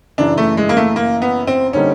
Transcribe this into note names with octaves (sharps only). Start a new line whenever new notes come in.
F#2 C#3 E3 D4
A3
G#3
A#3
A3
A#3
B3
C4
D3 G3 A#3 C#4 D#4